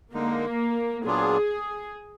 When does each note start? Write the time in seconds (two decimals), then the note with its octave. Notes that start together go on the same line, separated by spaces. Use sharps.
0.14 D3 G#3 A#3 D#4
1.05 A#2 F#3 B3 D4 F4 G#4